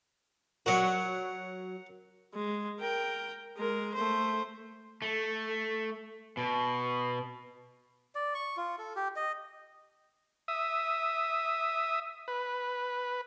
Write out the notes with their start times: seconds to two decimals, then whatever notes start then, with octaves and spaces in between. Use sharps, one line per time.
0.66 F#3 F#4 A#4 F#5
2.35 G#3
2.80 A#4 G5
3.57 G#3 A#4
3.95 A3 C5
5.02 A3
6.37 B2
8.15 D5
8.35 C#6
8.57 F4
8.78 A4
8.96 G4
9.16 D#5
10.48 E5 D#6
12.28 B4